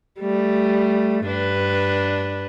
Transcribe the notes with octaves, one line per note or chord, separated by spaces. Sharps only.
G3 A3
G2 D4 B4